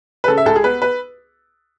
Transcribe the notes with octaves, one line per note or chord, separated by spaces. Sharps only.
B4
C#3 A4
E5
C#2 A4
G#4
B3 B4
B4